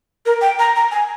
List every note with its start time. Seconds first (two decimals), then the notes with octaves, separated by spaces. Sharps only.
0.26 A#4
0.41 G5
0.59 A#5
0.76 A#5
0.91 G#5